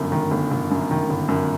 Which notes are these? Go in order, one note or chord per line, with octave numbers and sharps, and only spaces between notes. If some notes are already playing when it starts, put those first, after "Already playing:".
Already playing: G1 F#2
D#3
G1
G1
F#2
D#3
G1
F#2